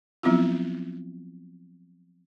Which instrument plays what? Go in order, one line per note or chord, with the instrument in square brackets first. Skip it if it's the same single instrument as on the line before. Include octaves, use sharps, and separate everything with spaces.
[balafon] F3 F#3 B3 C4 E4 F4